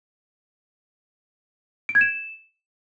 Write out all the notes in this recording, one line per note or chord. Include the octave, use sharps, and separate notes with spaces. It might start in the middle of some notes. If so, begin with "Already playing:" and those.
D7
G#6
E7